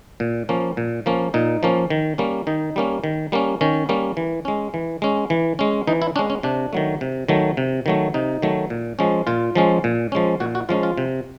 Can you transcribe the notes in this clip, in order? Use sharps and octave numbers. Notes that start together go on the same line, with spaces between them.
A#2
F3 A#3 C#4
A#2
F3 A#3 C#4
A#2 D#4
F3 A#3 C#4
D#3
G3 A#3 C#4
D#3 D#4
G3 A#3 C#4
D#3
G3 A#3 C#4
D#3 C#4
G3 A#3 C#4
E3
G#3 C#4
E3
G#3 C#4
E3
G#3 C#4
E3 D#4
E4
G#3 C#4 D4
C#4
C3 D4
D#3 F#3 A3
C3
D#3 F#3 A3
C3
D#3 F#3 A3
C3 D#4
D#3 F#3 A3
A#2
F3 G#3 C#4
A#2 F4
F3 G#3 C#4
A#2
F3 G#3 C#4
A#2 F#4
F#4
F3 G#3 C#4 F4
F4
C3